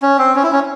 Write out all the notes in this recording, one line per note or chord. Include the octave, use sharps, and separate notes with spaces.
C#4
C4
C#4
E4
C#4